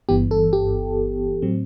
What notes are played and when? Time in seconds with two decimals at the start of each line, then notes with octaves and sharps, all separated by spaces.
0.09 G1 G2 E3 B3 G4
0.31 A4
0.53 G4
1.42 A2 F#3 C4